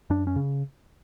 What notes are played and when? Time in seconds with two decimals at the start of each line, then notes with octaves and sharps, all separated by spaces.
0.10 F#2 D4
0.27 C#4
0.36 C#3